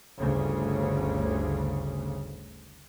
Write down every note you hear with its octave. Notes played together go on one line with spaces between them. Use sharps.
G1 D2 C#3